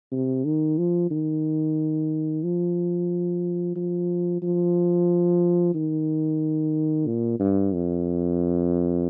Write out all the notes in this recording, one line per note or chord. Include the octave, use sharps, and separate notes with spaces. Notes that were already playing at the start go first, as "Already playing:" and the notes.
C3
D#3
F3
D#3
F3
F3
F3
D#3
A#2
G2
F2